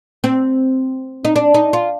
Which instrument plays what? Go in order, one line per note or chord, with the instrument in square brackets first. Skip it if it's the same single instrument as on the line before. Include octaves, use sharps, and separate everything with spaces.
[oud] C4
D#4
D4
D#4
F4